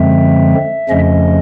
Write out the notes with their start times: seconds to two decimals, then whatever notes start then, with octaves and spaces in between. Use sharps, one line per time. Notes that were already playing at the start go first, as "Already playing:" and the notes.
Already playing: F#2 D3 F3 G#3 C4 E5
0.89 F2 C#3 F3 A3 C#4 D#5